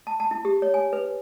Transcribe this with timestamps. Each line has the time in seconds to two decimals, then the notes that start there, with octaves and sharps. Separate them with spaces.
0.07 A5
0.20 A5
0.31 E4
0.45 G4
0.62 C#5
0.74 G#5
0.93 B4